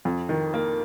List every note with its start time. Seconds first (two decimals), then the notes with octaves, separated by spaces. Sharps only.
0.05 F2
0.29 D#3
0.54 A#3